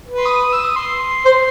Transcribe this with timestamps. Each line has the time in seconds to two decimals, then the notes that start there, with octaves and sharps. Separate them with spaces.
0.08 B4
0.17 C6
0.26 D#6
0.53 E6
0.63 D#6
0.76 C6
1.25 C5